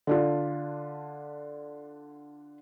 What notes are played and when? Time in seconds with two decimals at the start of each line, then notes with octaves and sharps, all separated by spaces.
0.07 D3 D4 F4